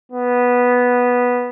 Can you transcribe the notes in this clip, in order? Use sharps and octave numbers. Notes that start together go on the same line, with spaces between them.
B3